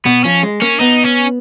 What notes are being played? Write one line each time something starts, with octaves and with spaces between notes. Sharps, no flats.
B2 B3
F3 C#4
G#3
A#3 C#4
B3 D#4
C#4